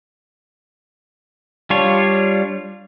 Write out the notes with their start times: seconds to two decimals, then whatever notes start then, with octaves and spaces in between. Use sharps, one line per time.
1.70 G3 D4 F4 C#5